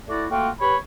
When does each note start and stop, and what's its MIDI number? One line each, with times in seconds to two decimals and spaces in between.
0.08 0.25 57
0.08 0.25 64
0.08 0.25 66
0.08 0.25 74
0.31 0.49 57
0.31 0.49 58
0.31 0.49 65
0.31 0.49 66
0.31 0.49 79
0.60 0.77 67
0.60 0.77 71
0.60 0.77 73
0.60 0.77 83